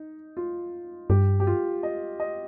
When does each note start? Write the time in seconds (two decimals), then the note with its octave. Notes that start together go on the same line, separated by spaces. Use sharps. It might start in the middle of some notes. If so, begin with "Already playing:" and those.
Already playing: D#4
0.37 F4
1.10 G2 G4
1.40 G4
1.47 F4
1.83 D#5
2.20 D#5